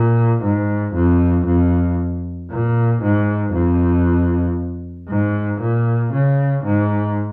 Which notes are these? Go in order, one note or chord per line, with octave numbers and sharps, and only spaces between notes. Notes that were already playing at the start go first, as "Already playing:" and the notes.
Already playing: A#2
G#2
F2
F2
A#2
G#2
F2
G#2
A#2
C#3
G#2